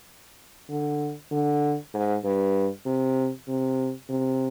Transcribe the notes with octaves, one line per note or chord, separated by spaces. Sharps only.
D3
D3
G#2
G2
C3
C3
C3